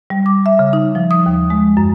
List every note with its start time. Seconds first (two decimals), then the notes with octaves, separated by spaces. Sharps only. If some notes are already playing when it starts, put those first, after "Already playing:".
0.10 G3
0.26 D6
0.46 E5
0.59 C#3
0.73 D#4
0.95 F3
1.11 D#6
1.26 D#2
1.50 G#3
1.77 F#2